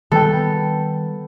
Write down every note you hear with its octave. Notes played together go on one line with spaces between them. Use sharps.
D#3 G3 B3 A4 G5